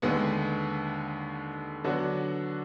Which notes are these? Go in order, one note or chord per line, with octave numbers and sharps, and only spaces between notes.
D#2 D3 G#3 B3
D3 F#3 B3 D4 F#4